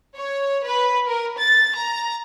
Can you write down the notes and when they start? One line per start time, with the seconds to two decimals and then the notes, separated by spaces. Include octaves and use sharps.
0.15 C#5
0.65 B4
1.07 A#4
1.37 A6
1.75 A#5